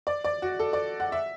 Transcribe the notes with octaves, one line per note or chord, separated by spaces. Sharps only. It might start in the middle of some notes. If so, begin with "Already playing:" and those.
D5
D5
F#4
A4
D5
F#5
E5